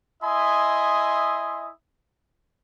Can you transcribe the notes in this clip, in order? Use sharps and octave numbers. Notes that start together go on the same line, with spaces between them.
E4 D#5 E5 G#5 C6 D#6